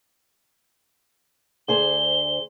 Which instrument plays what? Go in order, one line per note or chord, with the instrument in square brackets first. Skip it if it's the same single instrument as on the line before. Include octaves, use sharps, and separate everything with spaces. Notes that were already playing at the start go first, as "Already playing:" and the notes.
[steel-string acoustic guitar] D2 G#4 C5 [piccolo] G7